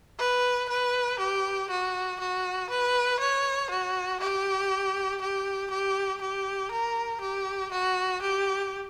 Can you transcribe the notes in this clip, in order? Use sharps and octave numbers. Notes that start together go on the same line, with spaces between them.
B4
B4
G4
F#4
F#4
B4
C#5
F#4
G4
G4
G4
G4
A#4
G4
F#4
G4